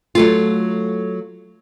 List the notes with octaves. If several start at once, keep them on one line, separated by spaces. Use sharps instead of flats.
F#3 A3 F4